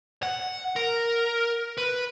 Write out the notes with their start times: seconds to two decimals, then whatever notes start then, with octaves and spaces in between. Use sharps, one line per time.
0.23 F#5
0.76 A#4
1.78 B4